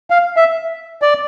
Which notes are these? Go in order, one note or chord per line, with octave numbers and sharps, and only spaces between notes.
F5
E5
D5